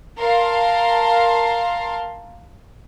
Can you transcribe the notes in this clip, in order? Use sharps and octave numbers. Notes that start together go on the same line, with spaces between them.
A#4 F5 A5 C6